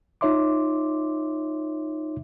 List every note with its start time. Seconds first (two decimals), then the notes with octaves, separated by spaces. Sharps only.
0.21 D#4 F4 C#5 E5 C6 D6